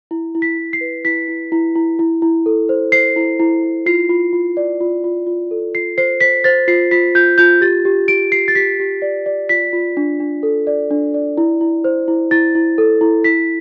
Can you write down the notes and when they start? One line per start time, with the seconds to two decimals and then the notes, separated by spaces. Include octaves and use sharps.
0.11 E4
0.35 E4
0.42 B6
0.58 E4
0.73 C7
0.81 B4
1.04 E4 B6
1.28 E4
1.52 E4
1.75 E4
1.99 E4
2.22 E4
2.46 A4
2.69 C5
2.92 C5 C7
3.16 E4
3.39 E4
3.63 E4
3.86 F4 C7
4.09 F4
4.33 F4
4.57 D5
4.81 F4
5.04 F4
5.27 F4
5.51 A4
5.75 F4 C7
5.98 C5 C7
6.21 C5 B6
6.44 C5 A6
6.68 F4 C7
6.91 F4 B6
7.15 F4 G6
7.38 F4 G6
7.61 G4 A6
7.85 G4
8.08 G4 D7
8.32 G4 C7
8.48 A6
8.55 G4 B6
8.80 G4
9.02 D5
9.26 D5
9.49 F4 B6
9.73 F4
9.97 D4
10.20 D4
10.43 A4
10.67 D5
10.91 D4
11.14 D5
11.38 E4
11.61 E4
11.84 C5
12.08 E4
12.31 E4 A6
12.55 E4
12.78 A4
13.01 E4
13.24 E4 B6